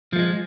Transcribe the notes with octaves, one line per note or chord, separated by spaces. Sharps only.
F3 G#3 A3